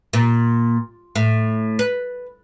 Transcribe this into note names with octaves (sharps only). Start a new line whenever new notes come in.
A#2
A2
B4